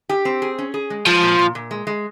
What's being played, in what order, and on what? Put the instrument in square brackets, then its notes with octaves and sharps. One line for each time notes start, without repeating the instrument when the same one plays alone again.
[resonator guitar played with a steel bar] G4
C4
G#4
C#4
G#4
G#3
[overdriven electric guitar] F3 [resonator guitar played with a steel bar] G#3
[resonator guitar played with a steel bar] A#2
A#2
A#2
G#3
G#3